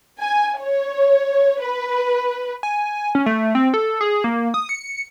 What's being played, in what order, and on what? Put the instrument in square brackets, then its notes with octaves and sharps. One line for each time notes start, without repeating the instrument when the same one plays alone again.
[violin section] G#5
C#5
B4
[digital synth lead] G#5
C#4
A3
C4
A4
G#4
A#3
D#6
C#7